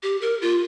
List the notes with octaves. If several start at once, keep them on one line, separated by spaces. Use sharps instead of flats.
G4
A#4
F4